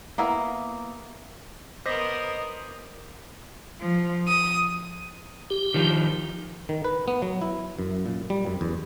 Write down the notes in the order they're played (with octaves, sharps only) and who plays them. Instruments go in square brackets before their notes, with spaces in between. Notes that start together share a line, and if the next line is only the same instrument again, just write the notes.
[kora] A#3 B3 E4 A#4
[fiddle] B3 A#4 [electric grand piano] C5 [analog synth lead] D#5 [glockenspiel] D6 D#6 B6
[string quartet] F3
D#6
[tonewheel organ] G4
[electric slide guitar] D#3 F3
[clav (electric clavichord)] D#3
B4
B3
F#3
E4
F#2
A#2
G3
F#2
E2